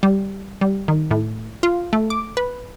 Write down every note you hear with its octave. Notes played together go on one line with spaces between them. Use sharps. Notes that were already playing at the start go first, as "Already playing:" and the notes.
G3
G3
D#3
A2
F4
A3
D6
B4